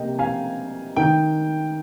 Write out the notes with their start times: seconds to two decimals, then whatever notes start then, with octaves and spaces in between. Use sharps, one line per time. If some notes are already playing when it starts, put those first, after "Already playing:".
Already playing: C3 A#3 D#5 G5
0.19 F5 G#5
0.96 D#3 G5